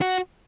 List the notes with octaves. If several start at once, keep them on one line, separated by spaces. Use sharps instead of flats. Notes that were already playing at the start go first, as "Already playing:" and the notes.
F#4